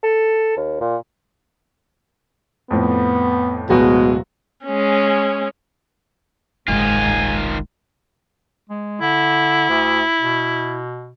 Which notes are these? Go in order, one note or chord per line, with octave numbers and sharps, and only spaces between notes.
A4
D#2
A#2
F2 A2 B3
D1 B2 F#3 G#3 F#4
G#3 C#4
F#1 C2 G#2 D#3 F4 G#5
G#3
D3 E4
D2
B2